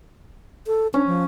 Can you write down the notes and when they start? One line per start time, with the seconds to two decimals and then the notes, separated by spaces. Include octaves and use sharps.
0.67 A4
0.94 C#4 D4
1.07 F3